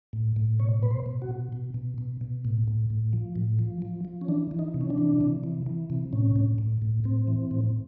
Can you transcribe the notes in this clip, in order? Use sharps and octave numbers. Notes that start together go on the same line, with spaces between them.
A2
A2
B2 C#5
B2 B4
C5
B2
F#4
B2
B2
B2
B2
B2
A2
A2
A2
F3
A2
F3
F3
F3
C#4
E3 D4
E3
D#4
C3
C#4
D4
E3
C3
E3
E3
C3
A2 C#4
A2
A2
A2
A2 C4
E3
A2